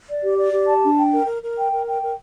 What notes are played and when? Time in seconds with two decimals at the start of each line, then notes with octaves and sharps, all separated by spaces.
0.08 D5
0.23 G4
0.37 D5
0.53 G4
0.67 A5
0.82 D4
0.98 G5
1.12 A#4
1.27 A#4
1.42 A#4
1.57 G5
1.72 A#4
1.87 G5
2.02 A#4